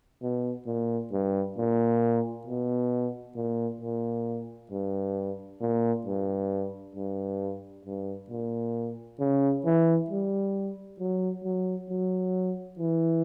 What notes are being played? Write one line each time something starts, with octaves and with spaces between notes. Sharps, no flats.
B2
A#2
G2
A#2
B2
A#2
A#2
G2
A#2
G2
G2
G2
A#2
C#3
E3
G3
F#3
F#3
F#3
E3